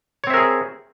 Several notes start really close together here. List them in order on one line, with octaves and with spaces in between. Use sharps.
C#5 C4 E5 A#4 G#4